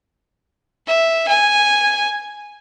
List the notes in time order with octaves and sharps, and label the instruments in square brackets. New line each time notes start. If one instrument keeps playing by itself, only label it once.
[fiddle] E5
G#5